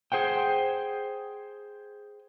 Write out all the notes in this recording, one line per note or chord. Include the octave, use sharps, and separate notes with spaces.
G#4 C5 F#5 G5